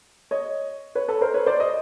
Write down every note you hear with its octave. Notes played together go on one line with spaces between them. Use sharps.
C#5 D#5
B4 C#5
A4 B4
A#4 C5
B4 C#5
C5 D5
C#5 D#5